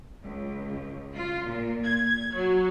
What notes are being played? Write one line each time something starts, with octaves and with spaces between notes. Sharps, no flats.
C#2
F4
A#2
G#6
F#3